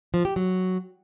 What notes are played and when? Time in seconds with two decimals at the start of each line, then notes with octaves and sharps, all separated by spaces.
0.14 F3
0.25 G4
0.36 F#3